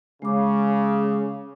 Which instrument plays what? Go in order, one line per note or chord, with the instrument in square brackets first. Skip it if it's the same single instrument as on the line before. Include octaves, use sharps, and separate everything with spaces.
[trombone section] C#3 [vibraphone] G#3 D6